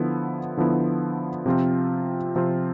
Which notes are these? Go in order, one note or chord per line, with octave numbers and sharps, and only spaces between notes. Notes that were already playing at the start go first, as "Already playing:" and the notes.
Already playing: D3 F3 B3 E4
D3 F3 B3 E4
C3 F3 C4 F4
C3 F3 C4 F4